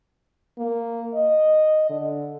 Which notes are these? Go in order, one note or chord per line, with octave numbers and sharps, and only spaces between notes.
A#3
D#5
D3